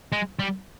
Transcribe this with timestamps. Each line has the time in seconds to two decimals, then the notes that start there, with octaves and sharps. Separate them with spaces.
0.12 G#3
0.39 G3